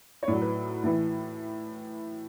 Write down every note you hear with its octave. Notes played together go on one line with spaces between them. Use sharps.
C#5
A2 F#3 D5
B4
A2 E3